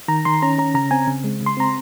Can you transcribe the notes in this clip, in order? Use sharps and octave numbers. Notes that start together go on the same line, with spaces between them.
D#3 A#5
D#3 C6
C#4 A#5
C#4 A#5
C#3 A#5
C4 G#5
C#3
G#3
C#3
C6
C4 A#5